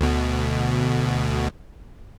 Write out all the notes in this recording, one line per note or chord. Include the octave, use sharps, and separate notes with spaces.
D2 B2